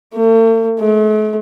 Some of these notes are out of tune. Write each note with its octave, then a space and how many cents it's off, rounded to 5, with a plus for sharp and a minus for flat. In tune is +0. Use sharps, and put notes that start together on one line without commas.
A3 +45
A3 -45